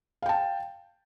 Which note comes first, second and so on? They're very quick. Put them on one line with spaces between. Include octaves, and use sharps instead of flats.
F5 G5 A5